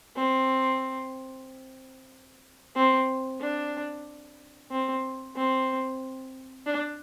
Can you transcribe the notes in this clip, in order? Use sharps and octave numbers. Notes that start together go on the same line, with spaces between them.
C4
C4
D4
C4
C4
D4